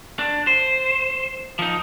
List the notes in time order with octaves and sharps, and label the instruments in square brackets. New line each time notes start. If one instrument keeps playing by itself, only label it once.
[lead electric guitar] D4
C5
F3 D#4